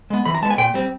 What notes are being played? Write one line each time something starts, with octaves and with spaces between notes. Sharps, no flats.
G#3 B3
E3 B5
A#5
G#3 B3 A5
G#5
A#2 G5
G3 C4